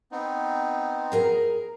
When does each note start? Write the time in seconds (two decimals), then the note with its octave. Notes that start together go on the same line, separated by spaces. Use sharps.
0.12 B3 C4 D#4
1.12 G#4 A#4 A#5